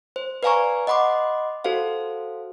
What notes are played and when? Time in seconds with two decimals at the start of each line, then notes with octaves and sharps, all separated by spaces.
0.16 C5
0.43 B4 D5 F5 G#5 A#5 C#6
0.87 D#5 F#5 B5 C6 D6
1.64 F#4 A4 C5 F5